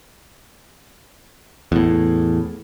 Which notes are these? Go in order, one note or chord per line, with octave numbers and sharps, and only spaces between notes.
E2 A2